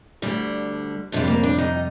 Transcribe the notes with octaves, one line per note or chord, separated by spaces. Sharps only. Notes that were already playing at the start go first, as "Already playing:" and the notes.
D2 D3 G3
F2 C3 G3 D4
A#3
D4
D#4